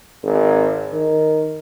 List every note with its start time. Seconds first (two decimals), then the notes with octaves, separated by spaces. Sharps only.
0.23 G#1
0.92 D#3